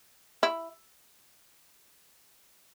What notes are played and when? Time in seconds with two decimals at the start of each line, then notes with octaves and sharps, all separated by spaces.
0.43 E4